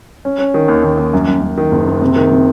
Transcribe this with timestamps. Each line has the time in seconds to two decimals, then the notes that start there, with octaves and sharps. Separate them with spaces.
0.25 C#4
0.39 C#4
0.54 D#3
0.68 D#2
0.83 D#2
0.98 D#2
1.13 F#2
1.27 F#2
1.42 F#2
1.57 D#3
1.72 F#1
1.87 F#1
2.02 C3
2.16 D#3
2.31 C3